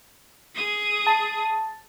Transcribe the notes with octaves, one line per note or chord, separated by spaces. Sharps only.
G#4 D#6
A5